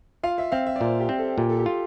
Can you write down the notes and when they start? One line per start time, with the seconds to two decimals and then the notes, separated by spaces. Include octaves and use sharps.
0.23 F4 F5
0.38 E5
0.52 C4 F5
0.66 E5
0.76 D5
0.80 A#2 C5
1.00 G4
1.09 C4
1.19 A4
1.38 A#2 G4
1.49 A4
1.59 G4
1.66 F4